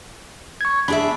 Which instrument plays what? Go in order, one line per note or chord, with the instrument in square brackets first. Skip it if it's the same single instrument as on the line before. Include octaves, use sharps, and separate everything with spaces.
[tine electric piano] C#6 G#6
[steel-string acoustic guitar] D4 G#4 E5 [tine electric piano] B5